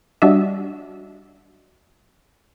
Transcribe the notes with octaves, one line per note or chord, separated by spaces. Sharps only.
G3 D4 F#4 D#5 E5